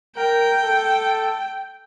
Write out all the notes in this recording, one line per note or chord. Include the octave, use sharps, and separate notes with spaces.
A#4 G5
A4